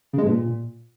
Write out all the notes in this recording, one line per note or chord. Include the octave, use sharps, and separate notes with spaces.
C#3
G#3
G2
A#2